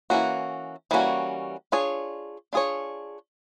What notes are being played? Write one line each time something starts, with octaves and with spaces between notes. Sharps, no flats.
E3 G3 A#3 C#4 F#4
E3 G3 A#3 C#4 F#4
D4 F4 G#4 C#5
D4 F4 G#4 C#5